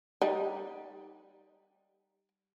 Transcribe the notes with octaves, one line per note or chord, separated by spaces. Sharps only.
G3 D#4